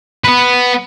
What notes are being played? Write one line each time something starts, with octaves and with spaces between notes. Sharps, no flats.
B3 B4